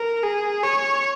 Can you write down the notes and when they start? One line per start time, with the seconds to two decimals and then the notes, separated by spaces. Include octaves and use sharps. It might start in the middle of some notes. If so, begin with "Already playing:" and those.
Already playing: A#4
0.24 G#4
0.63 C#5